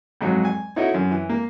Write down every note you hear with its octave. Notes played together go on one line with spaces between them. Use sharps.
F2 G#2 F#3
G#5
D#4 E4 F#4 A4 C#5 D#5
F#2
E3
A#3